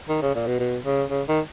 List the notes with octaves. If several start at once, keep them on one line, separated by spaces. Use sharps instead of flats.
D#3
C#3
A#2
B2
B2
C#3
C#3
D#3